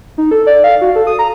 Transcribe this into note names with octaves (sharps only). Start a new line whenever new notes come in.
D#4
A4
D5
F5
F#4
A4
D#6
A#5